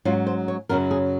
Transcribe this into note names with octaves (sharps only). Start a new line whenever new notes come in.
G#2 F#3 C#4 F4
C5
C#5
F#2 C#3 F#3 C#4 A#4
G#4